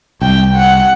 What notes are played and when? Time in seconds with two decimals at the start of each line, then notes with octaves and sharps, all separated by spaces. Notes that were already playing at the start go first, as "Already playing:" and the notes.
0.22 C2 G5
0.55 F#5